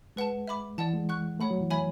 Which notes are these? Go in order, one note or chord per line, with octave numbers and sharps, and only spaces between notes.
G#3 B4 F#5 A5
E5 B5 D6
E3 D5 F#5 A5
G#3
F#5 C#6 F#6
A3 C#5 F#5 B5
F#3
E3
C#5 E5 G#5 B5